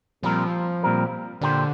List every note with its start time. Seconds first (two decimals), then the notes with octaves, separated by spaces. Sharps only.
0.23 A#2 F3 G3 C4 A#4
0.83 A#2 G3 C4 A#4
1.41 A#2 D3 A#3 G4 C5